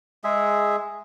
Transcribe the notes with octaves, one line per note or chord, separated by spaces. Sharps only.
G#3 G#4 E5